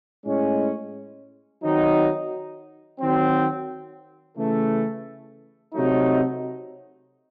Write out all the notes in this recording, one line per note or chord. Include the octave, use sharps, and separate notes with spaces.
A2 G#3 C#4
D#3 F#3 C4 D#4
D#3 F#3 C4
C#3 E3 A3
C3 F#3 A3 D#4